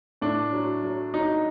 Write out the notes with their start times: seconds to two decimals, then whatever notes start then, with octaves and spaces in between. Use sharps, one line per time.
0.21 A2 D4
0.53 F#3
0.84 F#3
1.14 F#3 D#4